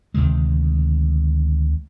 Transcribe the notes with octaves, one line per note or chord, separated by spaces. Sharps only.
D2 C3 D#3 G#3